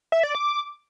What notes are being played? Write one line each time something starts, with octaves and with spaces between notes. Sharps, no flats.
E5
D5
D6